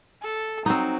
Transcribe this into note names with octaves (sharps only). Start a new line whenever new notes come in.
A4
F#3 C4 D#4